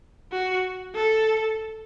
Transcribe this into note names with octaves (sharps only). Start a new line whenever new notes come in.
F#4
A4